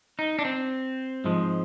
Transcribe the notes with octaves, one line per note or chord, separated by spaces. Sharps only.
D#4
D4
C4
G#2 F3 G#3